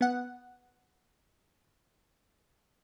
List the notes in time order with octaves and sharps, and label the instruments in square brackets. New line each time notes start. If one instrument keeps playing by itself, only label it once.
[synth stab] B3 F#5